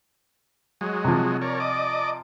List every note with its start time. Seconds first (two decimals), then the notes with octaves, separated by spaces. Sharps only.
0.81 F#3 G#3
1.05 C3 F3
1.41 A#4 C#5 D5
1.60 D5 D#5 D6